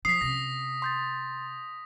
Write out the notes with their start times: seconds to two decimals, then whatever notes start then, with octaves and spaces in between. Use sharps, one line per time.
0.05 F3 D#6 B6 C7
0.21 C3 C#4 A#6
0.82 C6 G6 A6